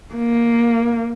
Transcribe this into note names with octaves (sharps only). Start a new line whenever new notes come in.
A#3